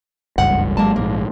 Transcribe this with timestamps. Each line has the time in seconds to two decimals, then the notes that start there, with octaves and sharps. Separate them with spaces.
0.38 F#1 C#2 G2 F#5
0.77 G#1 F#3 G#3 A#3 A5
0.96 A#1 G#2 A#3